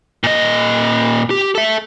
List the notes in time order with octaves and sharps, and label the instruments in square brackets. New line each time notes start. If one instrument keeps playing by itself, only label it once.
[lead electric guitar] A#2 D#5
G4
A4 E5